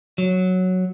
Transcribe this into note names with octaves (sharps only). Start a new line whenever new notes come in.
F#3